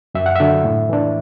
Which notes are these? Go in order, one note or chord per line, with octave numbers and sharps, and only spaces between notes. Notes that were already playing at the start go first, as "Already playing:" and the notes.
F#2 E5
F#5
D3 F#3 D4 E5
A2
E3 D4